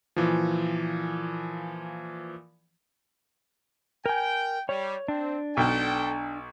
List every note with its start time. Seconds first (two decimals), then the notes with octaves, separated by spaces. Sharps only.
0.16 A#2 E3 F3
4.06 A#4 G5 G#5
4.69 G3 C#5
5.08 C4 D4
5.57 B1 A4 G5